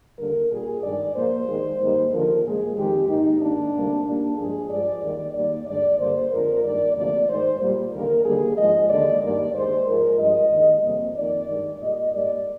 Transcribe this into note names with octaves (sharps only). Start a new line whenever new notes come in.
D#2 D3 G3 A#3 A#4
A#2 G3 A#3 G#4
G2 D#3 G#3 D5
A#2 F3 A#3 C5
D#2 D#3 G#3
G#2 D#3 G3 A#3
D#2 D3 F3 A#3 A#4
A#2 G#3 G#4
F2 D#3 G#3 G4
G#2 D#3 A#3 D#4
G#2 D#3 A#3 D4
D2 C3 G3 A#3
A#2 G3 A#3 D4
G2 F3 G#3 G#4
G2 F3 G#3 D5
D#2 D#3 G3 A#3 D5
D#2 D#3 G3 A#3 D5
G2 D3 G#3 D5
G2 D3 G3 A#3 C5
F2 D3 F3 G#3 A#4
G2 D#3 G3 A#3 D5
D2 C3 F3 A#3 D5
G#2 D#3 G#3 C5
A#2 G3 A#3
D#2 D3 G3 A#3 A#4
D#2 D3 G3 A#3 G#4
G#2 F3 G#3 D#5
D#2 D3 G#3 D5
G2 D#3 A#3 D5
D#2 D#3 G#3 C5
G#2 F3 G#3 A#4
G2 F3 G#3 D#5
D#2 D#3 G#3
F2 C3 G3 A#3
F2 D#3 A#3 D5
G2 D#3 G#3
A#2 G3 A#3 D#5
G#2 G3 A#3 D5